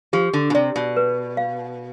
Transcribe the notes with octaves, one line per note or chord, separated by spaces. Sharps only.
F3 G4
D3
B2
C3 D5
B2
B4
F5